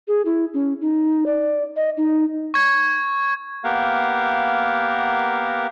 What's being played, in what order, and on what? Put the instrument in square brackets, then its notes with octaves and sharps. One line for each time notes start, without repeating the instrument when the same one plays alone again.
[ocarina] G#4
E4
C#4
D#4
D5
D#5
D#4
[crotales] C#6 G#6
[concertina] A#3 B3 G4 A#4 F5 F#5